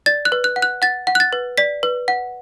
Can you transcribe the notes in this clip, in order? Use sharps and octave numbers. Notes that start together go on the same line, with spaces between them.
D5 A6
F#6
B4
F#6
F#5
F#6
F#5 A6
F#5
F#6
A6
B4
D5 B6
B4
F#5